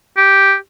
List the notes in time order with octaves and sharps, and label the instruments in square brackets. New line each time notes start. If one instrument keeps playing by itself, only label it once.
[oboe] G4